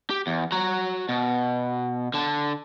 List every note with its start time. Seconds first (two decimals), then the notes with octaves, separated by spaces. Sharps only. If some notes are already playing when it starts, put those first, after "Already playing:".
0.10 G4
0.27 E2
0.52 F#4 A#5
1.09 B2
2.14 D3 A5